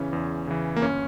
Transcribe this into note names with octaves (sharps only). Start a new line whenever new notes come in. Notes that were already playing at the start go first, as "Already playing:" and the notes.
Already playing: E2 C#3 E3 C#4
E2
C#3 E3
A#3
G1 C#4